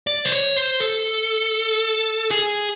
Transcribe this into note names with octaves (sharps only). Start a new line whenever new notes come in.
D5
C5
C#5
C5
A4
G#4